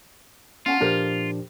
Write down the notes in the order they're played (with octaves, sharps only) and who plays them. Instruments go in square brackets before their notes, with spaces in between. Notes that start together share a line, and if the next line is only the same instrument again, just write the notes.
[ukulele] C#4 F#5 A5 [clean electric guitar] F4
[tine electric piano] A#2 F3 D4 [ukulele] G4 A#4 C5